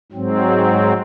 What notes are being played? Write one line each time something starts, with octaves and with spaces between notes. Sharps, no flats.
G#2 F#3 C4